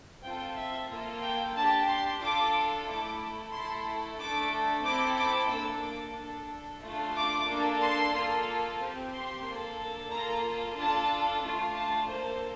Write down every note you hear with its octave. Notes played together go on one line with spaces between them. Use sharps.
C4 F4 A4 G5
E5
A#3 F4 A4
G5
D4 G4 A5
C6
D4 F4 A4 D6
A3 E4 A4 D6
A3 E4 A4 C6
A3 D4 A4 D6
C4 E4 A4 D6
D6
A#3 D4 A4 E6
D6
D4 A4
A3 D4 F4 A4
D6
A#3 D4 A4
C6
A#3 F4 A4
C4 G4
C6
A#3 D4 A4
A#3 F4 A4 A#5
D4 F4 A4 A5
A3 D4 F4
A5
A#3 D4 A4 C5